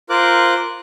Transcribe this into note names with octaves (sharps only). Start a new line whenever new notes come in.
F4 A#4 C5 D6 F#6